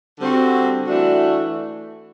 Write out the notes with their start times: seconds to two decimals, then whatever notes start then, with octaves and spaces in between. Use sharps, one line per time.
0.20 D3 G3 C4 F#4
0.87 E3 A3 D4 F#4